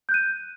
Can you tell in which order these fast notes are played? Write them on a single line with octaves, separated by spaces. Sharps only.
G6 F#6 D#7